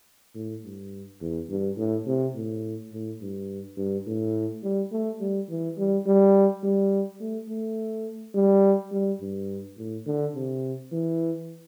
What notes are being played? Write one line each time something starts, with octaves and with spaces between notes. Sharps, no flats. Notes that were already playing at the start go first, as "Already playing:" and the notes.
A2
G2
E2
G2
A2
C3
A2
A2
G2
G2
A2
G3
A3
G3
E3
G3
G3
G3
A3
A3
G3
G3
G2
A2
D3
C3
E3